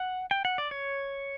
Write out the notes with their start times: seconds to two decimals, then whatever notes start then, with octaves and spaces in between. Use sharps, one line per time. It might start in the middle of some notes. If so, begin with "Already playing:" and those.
Already playing: F#5
0.31 G5
0.45 F#5
0.58 D5
0.71 C#5